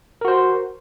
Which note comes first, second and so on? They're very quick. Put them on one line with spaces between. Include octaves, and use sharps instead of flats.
A#4 F#4 C5